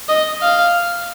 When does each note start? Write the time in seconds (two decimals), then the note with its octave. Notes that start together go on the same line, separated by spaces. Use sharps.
0.08 D#5
0.42 F5